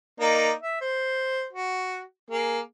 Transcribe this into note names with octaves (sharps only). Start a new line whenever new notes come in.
A#3 D#4 D5
E5
C5
F#4
A#3 G#4